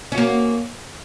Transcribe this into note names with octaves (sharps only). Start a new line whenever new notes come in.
A#3 C#4 F#4